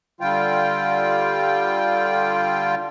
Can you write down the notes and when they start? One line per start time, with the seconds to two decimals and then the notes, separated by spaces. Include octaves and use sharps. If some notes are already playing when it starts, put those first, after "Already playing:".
0.21 D3 G3 F4 G5